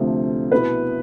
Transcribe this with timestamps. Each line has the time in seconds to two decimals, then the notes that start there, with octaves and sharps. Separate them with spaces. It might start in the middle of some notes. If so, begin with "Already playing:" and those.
Already playing: D2 C3 F3 A3
0.52 B2 B3 E4 B4